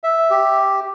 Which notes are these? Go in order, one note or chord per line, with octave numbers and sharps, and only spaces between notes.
E5
G4